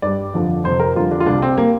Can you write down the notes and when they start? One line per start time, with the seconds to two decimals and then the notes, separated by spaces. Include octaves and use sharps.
0.02 G2 G3 D5
0.34 F2 D3 F3
0.64 F2 C3 F3 C5
0.80 A#4
0.96 F2 D3 G3 F4
1.11 D4
1.20 F4
1.26 C2 C3 G3 D4
1.42 C4
1.57 G3 A#3